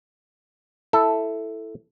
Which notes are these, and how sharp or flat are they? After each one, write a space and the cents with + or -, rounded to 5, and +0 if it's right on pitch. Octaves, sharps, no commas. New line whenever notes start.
E4 +0 A4 +0